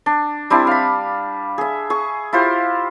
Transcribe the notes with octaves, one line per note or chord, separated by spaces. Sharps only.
D4
G3 C4 D4 E4
F5 B5
G#4 E5
G#4 C#6
E4 F4 G4 C5